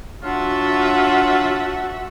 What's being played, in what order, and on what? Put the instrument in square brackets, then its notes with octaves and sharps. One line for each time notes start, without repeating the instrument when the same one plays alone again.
[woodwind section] F#3 D4 F4 [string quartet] F#4 E5 F#5